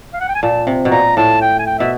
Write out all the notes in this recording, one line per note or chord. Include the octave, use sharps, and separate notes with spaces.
F5
F#5
G5
G#5
A#2 A5
C3
B2
A#2 A#5
A2 A5
G5
G#5
G5
B2 E5